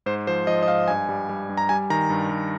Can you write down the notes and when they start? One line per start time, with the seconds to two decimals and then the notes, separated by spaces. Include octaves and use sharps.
0.06 G#2 C5
0.27 F3 C5
0.47 F3 D#5
0.63 D#5
0.68 G#2 F5
0.88 G2 G#5
1.09 G3
1.29 G3
1.49 G2
1.57 A#5
1.69 G3 G#5
1.90 D#3 A#5
2.10 G2
2.31 G2